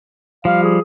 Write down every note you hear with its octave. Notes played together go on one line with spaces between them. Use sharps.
F3 G3 F5
G#4